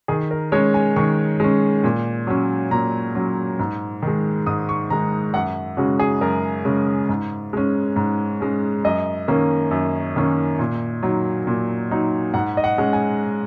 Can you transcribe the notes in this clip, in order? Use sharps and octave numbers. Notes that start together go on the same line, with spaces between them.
D#3 G#4
A#4
G#3 C#4 C#5
G#5
D#3 C#6
G#3 C#4
A#2
F#3 C#4
A#2 A#5
F#3 C#4
G#2
D#3 G#3
G#2 D#6
C#6
D#3 G#3 A#5
F#2 F#5
C#3 G#3 C#4 F#4
G#4
F#2 A#4
C#3 G#3 C#4
G#2
G#3 C#4
G#2
G#3 C#4
F#2 D#5
D#3 A#3 C#4
F#2
D#3 A#3 C#4
A#2
F#3 D#4
A#2
F#3 D#4
G#2 F#5
D#5
F#5
G#3 C#4
G#5